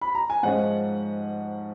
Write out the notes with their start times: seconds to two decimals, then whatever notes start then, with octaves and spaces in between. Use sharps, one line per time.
0.01 B5
0.15 A#5
0.30 G#5
0.43 G#2 F3 G#3 C#4 F#5